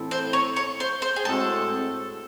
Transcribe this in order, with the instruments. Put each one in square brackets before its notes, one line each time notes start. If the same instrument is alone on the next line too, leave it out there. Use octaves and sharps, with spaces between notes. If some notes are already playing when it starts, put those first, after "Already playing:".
Already playing: [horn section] A2 E3 C4 E4 A4
[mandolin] C5
C#5
C#5
C5
C5
G#4
[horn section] A2 G#3 C4 F#4 [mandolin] A4